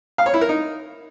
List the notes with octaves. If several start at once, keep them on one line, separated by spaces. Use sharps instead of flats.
F5
C#5
E4
A#4
D#4